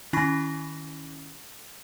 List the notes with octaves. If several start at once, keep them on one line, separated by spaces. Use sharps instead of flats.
D#3 C#4 E4 B5 C#6 A#6